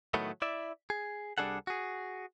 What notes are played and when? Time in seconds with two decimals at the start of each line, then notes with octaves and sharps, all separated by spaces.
0.14 A2 D#3 F#3 A3 B3
0.42 E4 D5 E5
0.90 G#4
1.38 C2 G3 D4 G#4 A4 F#5
1.67 F#4 G#4